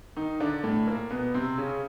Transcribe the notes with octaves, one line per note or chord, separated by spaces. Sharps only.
D#3 D#4
D3 D4
A2 A3
A#2 A#3
B2 B3
C3 C4
C#3 C#4